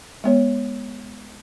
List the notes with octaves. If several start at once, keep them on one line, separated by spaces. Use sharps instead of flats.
G#3 B3 C#5